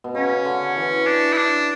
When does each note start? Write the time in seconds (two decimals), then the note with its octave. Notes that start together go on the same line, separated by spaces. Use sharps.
0.04 B2
0.15 C#3 C#4
0.45 D3
0.76 E3
1.06 D4
1.33 E4
1.37 D4